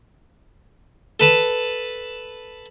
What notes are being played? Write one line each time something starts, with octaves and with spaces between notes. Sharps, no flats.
A4 B4 A5